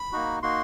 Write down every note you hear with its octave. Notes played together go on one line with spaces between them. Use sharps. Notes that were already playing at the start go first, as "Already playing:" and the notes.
Already playing: B5
A#3 D#4 F#4
A#3 D#4 F#4 C6